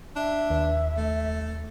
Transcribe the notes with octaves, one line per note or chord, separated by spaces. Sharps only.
D4 E5
D#2
A3